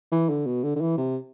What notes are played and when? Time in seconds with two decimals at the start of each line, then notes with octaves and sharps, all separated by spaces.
0.12 E3
0.30 D3
0.46 B2
0.64 D3
0.76 D3
0.81 E3
0.98 C3